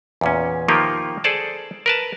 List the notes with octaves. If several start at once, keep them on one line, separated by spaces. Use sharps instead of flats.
E2 A#2 C#4
D#3 F3 A#3 F4 G4 A#4
G#4 A4 C5 D5 A5
A#4 B4 A5